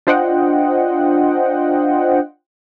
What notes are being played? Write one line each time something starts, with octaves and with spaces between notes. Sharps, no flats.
D4 F4 C5 D#5 F#5 G5